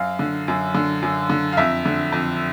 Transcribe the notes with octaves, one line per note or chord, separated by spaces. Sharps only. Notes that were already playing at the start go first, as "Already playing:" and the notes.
Already playing: F#2 F5
D3
F#2
D3
F#2
D3
F5
F2 E5
D3
F2